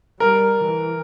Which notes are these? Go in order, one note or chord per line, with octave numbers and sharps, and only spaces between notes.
G3 A#4
E3